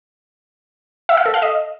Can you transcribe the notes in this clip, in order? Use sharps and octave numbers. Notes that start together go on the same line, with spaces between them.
E5
F5
A4
F5
D#5